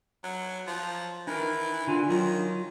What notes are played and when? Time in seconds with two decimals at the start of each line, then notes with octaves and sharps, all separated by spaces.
0.24 F#3
0.67 F3
1.27 E3 D#4 A#4
1.87 D3 F4 G#5
2.09 D#3 F#3 F4